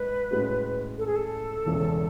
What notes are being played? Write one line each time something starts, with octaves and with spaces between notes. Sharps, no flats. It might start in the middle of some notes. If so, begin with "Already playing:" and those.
Already playing: G#2 B4
A2 G#3 C#4 F#4
A4
G#4
A4
E1 E2 C#3 E3